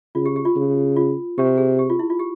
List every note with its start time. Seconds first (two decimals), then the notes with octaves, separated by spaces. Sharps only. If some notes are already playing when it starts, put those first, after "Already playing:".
0.15 C#3 F4
0.26 G4
0.36 G4
0.45 F4
0.56 C#3
0.96 F4
1.38 C3 G4
1.58 G#4
1.79 G4
1.89 F4
1.99 E4
2.10 F4
2.19 G4